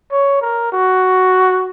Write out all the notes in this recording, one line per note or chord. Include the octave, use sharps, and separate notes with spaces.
C#5
A#4
F#4